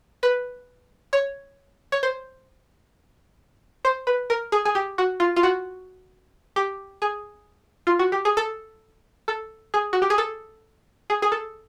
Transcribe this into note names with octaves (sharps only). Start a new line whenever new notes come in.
B4
C#5
C#5
C5
C5
B4
A#4
G#4
G#4
G4
F#4
F4
F4
F#4
G4
G#4
F4
F#4
G4
G#4
A4
A4
G#4
F#4
G4
G#4
A4
G#4
G#4
A4